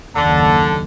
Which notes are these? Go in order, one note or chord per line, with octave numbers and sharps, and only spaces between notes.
F#1 D#2 D3 A5